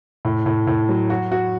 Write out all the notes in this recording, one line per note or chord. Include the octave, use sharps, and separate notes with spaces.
A2
A2
A2
F#3
F#4
F#4